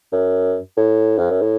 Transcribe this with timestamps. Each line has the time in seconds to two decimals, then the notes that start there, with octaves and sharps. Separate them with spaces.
0.12 F#2
0.77 A2
1.18 F2
1.30 F#2
1.42 A2